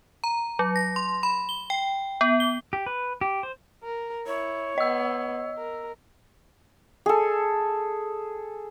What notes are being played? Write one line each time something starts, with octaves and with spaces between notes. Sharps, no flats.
A#5
F#3
A#6
C6
B5
G7
G5
B3
G7
G4
B4
G4
C5
A#4
E4 C#5
B3 D#5 E6
A#4
G#4 A4